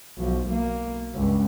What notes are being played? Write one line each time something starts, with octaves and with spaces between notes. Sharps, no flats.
B1 F3
B1 A#3
C#2 G2